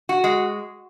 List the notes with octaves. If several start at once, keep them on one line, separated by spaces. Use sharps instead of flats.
F#4
G#3